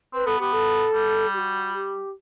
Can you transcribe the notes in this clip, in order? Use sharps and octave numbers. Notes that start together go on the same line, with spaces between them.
C4 B4
B3 A4
B3 G4
A4
G3
G4
F#4
G4